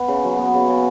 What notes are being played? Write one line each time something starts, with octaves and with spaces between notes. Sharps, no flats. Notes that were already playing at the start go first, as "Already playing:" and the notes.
Already playing: B3
C#3
F#3
B3
C#3
C#3